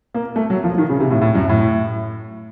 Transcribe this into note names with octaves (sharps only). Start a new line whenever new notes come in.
A#3
A3
F#3
F3
D#3
C#3
C3
A2
A2
F#2
A2